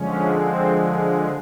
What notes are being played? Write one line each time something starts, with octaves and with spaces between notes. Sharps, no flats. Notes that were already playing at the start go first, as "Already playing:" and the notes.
Already playing: D3 F3 G#3 C#4
C4